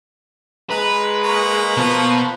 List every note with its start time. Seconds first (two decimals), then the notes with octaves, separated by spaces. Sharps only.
0.71 G#3 B4 A#5
1.24 A#3 A#5 C#6
1.77 B2 F3 B4